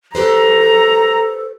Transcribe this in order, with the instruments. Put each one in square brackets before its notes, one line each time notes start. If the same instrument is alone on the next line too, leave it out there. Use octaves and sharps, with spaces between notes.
[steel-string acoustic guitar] G4 B4 C5 [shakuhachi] A4 [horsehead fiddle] A#5